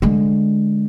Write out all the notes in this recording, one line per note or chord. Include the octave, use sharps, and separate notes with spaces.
D3 G#3